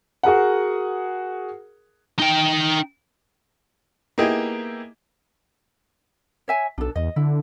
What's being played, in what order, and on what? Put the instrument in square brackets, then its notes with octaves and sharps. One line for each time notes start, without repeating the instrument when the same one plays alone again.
[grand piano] F#4 G#4 A#4 F#5
[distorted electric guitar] D#4 G5
[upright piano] A#3 B3 D#4 E4 G4 G#4
[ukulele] C#5 E5 G#5
[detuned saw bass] B1 [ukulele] D4 A4
[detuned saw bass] E2 [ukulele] D#5
[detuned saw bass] D3 [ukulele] E4